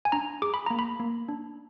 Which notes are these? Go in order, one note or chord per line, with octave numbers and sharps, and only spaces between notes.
G#5
D4 A#5
G#4 D6
B5
A#3 A#5
B5
A#3
D4